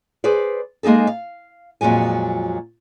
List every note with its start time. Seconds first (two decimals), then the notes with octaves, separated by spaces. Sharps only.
0.24 G#4 B4 C5 D5
0.83 G#3 A#3 D#4 G#4 A4
1.07 F5
1.81 F2 A#2 F#3 G#3 G#5